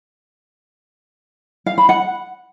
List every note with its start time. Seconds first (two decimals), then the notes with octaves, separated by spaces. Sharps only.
1.66 F5
1.78 B5
1.89 F#5